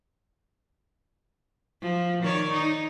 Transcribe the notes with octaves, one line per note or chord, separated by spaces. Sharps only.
F3
D#3 C#5 D5
D#4